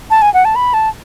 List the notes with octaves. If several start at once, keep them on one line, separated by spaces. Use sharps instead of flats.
A5
G#5
F#5
A5
B5
A5